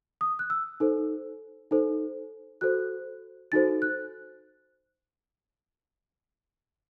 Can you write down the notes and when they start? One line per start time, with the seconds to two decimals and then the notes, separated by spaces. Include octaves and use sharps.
0.21 D#6
0.39 F#6
0.50 E6
0.80 D#4 A4 C5
1.71 D#4 A4 C5
2.61 F#4 A4 C5 F#6
3.52 D#4 F#4 A4 C5 A6
3.82 F#6